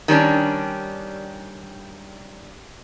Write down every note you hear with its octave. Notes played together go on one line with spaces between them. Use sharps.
D#3 G3 C#4 D4